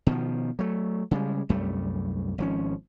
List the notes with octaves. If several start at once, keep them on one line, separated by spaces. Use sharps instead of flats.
B2 D#3 F3
F#3 A3
C#3 G3 G#3
C2 F#2 G3 A3
G#1 F3 C#4